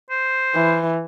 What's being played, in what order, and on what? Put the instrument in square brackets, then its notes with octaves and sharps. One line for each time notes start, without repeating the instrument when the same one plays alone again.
[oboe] C5
[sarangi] E3